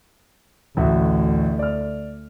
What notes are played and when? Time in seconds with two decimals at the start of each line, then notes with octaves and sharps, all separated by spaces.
0.77 A1 D2 F#4 E5
1.59 D5 F6